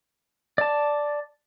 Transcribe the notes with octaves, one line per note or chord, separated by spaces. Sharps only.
D5 A5